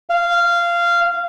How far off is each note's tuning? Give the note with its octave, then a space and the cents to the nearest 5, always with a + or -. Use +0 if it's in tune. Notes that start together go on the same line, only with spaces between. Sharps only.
F5 -15